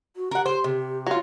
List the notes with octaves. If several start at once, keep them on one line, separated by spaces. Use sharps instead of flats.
F#4
G4 A#4 F#5
C5
C3
F#3 F4